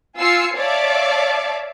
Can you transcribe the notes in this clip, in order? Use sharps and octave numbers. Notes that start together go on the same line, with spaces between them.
F4 G#5 E6 C7 C#7
C#5 D5 E5 F5 A5 D6